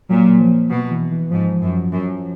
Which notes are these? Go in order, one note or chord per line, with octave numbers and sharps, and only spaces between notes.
A#2 F#3
F3
B2
E3
E3
G#2 F3
F#2
F#2